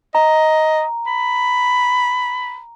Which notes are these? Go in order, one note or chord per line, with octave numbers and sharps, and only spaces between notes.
D#5 A#5
B5